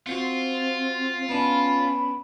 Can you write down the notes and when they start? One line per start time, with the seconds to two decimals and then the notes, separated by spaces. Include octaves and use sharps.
0.07 C4 F4 F#4 C5 F#5
1.29 B3 C#4 D4 B5